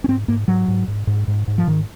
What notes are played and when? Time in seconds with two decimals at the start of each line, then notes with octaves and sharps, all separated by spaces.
0.04 C#4
0.08 G#2 C4
0.28 G#2 A#3
0.48 G#2 F#3
0.68 G#2
0.88 G#2
1.07 G#2
1.28 G#2
1.48 G#2
1.58 F3
1.67 G#2 D#3